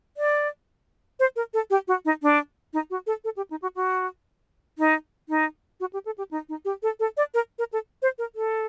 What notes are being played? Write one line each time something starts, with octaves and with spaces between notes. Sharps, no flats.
D5
C5
A#4
A4
G4
F#4
D#4
D4
D#4
F#4
A4
A4
G4
D#4
F#4
F#4
D#4
D#4
F#4
G4
A4
G4
D#4
D#4
G4
A4
A4
D5
A#4
A#4
A4
C5
A#4
A4